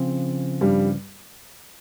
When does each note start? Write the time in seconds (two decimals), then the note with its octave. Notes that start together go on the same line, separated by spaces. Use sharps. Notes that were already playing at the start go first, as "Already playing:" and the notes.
Already playing: C#3 F3 C4
0.61 G2 G3